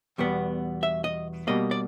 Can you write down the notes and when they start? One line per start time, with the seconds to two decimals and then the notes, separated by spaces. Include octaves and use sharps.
0.18 E2 B2 G3 B3
0.83 E5
1.04 D#5
1.47 B2 G3 A#3 D#5
1.71 D5